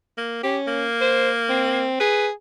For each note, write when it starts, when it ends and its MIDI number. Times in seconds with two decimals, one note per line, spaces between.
0.18 0.43 58
0.43 0.84 61
0.43 0.58 67
0.67 1.88 58
1.01 1.30 72
1.49 1.99 60
2.00 2.30 68
2.00 2.27 71